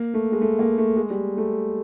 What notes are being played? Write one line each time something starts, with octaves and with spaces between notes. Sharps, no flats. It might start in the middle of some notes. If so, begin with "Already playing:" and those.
Already playing: A#3
A3
G#3
A3
A#3
A3
G#3
G3
A3